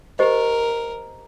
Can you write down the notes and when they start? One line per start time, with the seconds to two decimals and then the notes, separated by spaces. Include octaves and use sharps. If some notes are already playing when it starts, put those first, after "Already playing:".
0.19 G4 A#4 C5 D#5